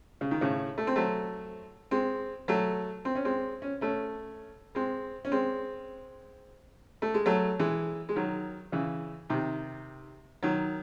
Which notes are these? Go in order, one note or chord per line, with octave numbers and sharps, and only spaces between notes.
C#3
D#3
A2 C#3
A3
C4
F#3 A3
G#3 C4
F#3 A3
C4
C#4
G#3 C4
C#4
A3 C#4
G#3 C4
C#4
G#3 C4
A3
G#3
F#3 A3
E3 G#3
G#3
D#3 F#3
C#3 E3
C3 D#3
D#3 F#3